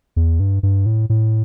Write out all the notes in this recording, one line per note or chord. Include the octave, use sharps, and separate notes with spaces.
E2
G2
G2
A2
A2